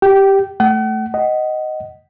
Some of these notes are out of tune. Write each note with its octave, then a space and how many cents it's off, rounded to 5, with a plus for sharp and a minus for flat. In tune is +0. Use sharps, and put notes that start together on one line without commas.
G4 +0 G5 -20
A3 -5 F#5 +40
D#5 +0 F#5 +20